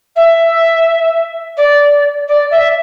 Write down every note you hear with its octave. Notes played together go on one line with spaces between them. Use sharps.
E5
D5
D5
E5